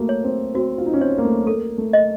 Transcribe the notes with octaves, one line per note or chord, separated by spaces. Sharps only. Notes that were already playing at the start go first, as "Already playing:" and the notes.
Already playing: A3 A#3 F#4
C#5
C4
C4 F#4
F4
D#4
C#4
C4 C#5
A#3
A3
A#3 A4
A3
D#5